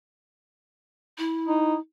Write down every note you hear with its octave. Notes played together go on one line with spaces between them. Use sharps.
E4
D#4